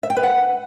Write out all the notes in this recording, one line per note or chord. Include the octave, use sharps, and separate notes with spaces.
E5
G5
B4
F#5